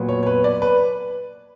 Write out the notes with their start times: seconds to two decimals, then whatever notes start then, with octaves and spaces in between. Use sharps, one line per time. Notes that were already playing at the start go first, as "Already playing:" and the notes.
Already playing: A#2 F#3 B3
0.09 C#5
0.23 C#5
0.27 B4
0.44 D5
0.62 B4